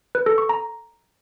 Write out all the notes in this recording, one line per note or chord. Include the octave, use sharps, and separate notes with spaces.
B4
A4
C#6
A#5